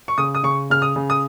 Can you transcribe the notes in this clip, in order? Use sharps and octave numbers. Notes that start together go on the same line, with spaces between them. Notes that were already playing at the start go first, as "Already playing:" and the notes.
C#6
C#3 D#6
D#6
C#3 C#6
C#3 F6
D#6
C#3
D#6